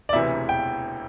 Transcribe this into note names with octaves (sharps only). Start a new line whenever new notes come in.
D5
E1 D2 C3 E3 E5
G5